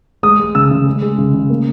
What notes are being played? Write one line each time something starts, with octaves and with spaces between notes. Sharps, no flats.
G#3 D#6
G#3
C#3 E6
C#3
G#3
G#3
C#3
C#3
A#3